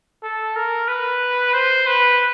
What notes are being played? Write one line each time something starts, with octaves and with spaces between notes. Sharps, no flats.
A4
A#4
B4
C5
B4